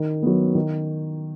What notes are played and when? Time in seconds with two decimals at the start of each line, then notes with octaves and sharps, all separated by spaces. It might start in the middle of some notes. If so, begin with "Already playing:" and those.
Already playing: D#3
0.22 F#3 B3
0.55 D#3